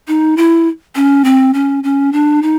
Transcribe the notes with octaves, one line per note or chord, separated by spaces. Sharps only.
D#4
E4
C#4
C4
C#4
C#4
D4
D#4